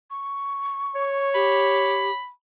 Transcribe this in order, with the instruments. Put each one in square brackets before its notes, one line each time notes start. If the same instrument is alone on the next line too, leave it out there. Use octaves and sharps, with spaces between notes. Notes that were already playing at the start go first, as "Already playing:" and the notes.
[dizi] C#6
[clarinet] C#5
[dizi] G4 [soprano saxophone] B5